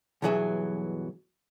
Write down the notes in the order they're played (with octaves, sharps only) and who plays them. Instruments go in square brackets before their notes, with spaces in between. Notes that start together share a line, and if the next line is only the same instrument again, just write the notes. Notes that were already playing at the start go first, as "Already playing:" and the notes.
[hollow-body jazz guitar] B1 G2 E3 F#3 G#4 E5